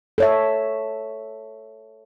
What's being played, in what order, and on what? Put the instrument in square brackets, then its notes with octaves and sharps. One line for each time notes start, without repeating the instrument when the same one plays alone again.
[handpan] A4 C#5 E5